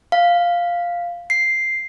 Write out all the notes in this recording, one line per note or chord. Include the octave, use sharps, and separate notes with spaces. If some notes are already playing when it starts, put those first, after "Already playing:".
F5
C7